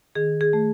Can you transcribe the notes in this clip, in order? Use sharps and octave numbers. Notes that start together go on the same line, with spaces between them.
D#3 G#4
G#4
A3